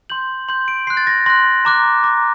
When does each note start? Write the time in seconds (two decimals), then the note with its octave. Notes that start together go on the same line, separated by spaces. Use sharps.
0.10 C6 G6 F#7
0.48 C6 G6 F#7
0.68 D7
0.87 C6 F#6 C7
0.97 A6
1.07 A#6
1.26 C6 F#6 A#6
1.65 A#5 D6 F#6
2.04 A#5 D6 F#6